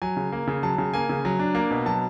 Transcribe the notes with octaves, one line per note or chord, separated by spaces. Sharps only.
F#3 G#5
C#3
A#3
C#3
F#3 A5
C#3
A#3 G#5
C#3
F#3
D4
A#3
B2
F#3 A5